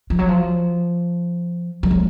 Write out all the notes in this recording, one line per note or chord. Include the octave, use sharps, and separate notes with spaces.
F3
F#3
F3
F#3
G#3